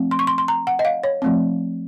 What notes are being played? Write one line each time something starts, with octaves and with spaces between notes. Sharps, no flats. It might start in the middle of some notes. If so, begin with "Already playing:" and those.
Already playing: F3 A3 C4
C6
C#6
C6
C6
A#5
F#5
D#5
F5
C#5
F3 A3 C4